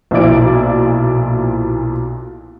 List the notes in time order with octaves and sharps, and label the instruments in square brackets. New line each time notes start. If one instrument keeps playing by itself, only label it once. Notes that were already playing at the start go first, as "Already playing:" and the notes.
[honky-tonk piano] B1 A#2 F3 E4 D5 D7